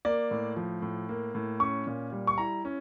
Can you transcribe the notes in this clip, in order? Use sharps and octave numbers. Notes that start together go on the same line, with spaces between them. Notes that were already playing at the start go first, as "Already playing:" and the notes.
A#3 D5
A2
F3
A2
A#3
A2
C#4 C#6
A#2
G3
C#6
E4 A#5
C#4